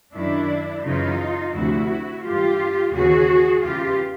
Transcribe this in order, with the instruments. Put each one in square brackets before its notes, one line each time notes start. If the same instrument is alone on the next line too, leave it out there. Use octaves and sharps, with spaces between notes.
[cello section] F#2 D#3 D4 E4
F#2 C#3 E3 D#4 F4
D2 C3 F3 E4 F#4
G2 E3 F4 G4
D#2 C#3 E3 F#4 G#4
E2 C#3 E3 F4 G4